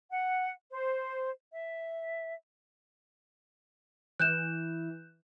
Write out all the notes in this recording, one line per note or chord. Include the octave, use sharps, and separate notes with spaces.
F#5
C5
E5
E3 F#6 G6 E7